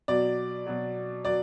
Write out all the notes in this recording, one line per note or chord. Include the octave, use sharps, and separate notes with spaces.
B2 F#3 D5
B2 F#3
F#3 D5